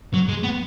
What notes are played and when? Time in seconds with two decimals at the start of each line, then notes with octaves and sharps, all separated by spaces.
0.14 F#3
0.29 G#3
0.43 B3